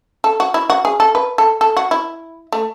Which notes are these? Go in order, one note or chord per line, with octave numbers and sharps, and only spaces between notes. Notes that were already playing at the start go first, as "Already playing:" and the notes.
A4
F#4
E4
F#4
G#4
A4
B4
A4
A4
F#4
E4
A3